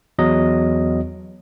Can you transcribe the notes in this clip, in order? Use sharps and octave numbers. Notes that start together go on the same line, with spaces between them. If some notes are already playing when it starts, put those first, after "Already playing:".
E2 F#3 D#5